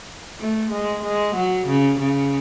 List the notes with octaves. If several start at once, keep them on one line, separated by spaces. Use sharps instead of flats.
A3
G#3
G#3
F#3
C#3
C#3